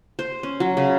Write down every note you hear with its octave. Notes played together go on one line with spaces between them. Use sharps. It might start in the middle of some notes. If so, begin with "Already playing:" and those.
C5
C#4
F#3
C#3